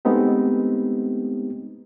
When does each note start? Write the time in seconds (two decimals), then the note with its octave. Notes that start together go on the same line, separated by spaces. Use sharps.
0.05 G#3 A3 B3 C4 D#4 G4